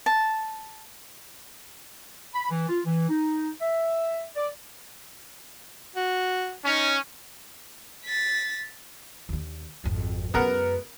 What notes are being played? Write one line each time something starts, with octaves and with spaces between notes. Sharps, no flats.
A5
B5
E3
F4
E3
D#4
E5
D5
F#4
C#4 D#4
A6 B6
D#2 D3
G#1 F2
F#2 G#3 B3 A#4 B4 F#5